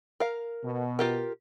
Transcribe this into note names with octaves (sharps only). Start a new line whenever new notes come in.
A#4 F5
B2
F4 G4 A#4